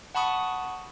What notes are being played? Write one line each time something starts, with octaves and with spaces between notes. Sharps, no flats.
F#5 A5 B5 C#6 D#6